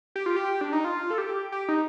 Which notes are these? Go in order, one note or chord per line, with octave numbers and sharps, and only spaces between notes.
G4
F4
G4
D4
D#4
F4
A4
G4
G4
D#4